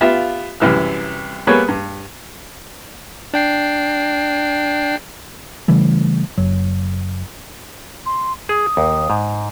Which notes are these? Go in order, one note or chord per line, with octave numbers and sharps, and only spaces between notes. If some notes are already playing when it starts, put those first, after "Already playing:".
B3 F4 G4 E5 F5
C2 F#2 E3 E5 F6
G3 A#3 B3 G#4 B4 C#5
G2
D4 G5 C7
C#3 E3 G3 A3
F#1 F#3
C6
G#4 D#6
D#2
G#2